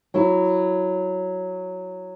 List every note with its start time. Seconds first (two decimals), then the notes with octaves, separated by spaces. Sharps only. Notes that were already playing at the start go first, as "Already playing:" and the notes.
0.14 F#3 E4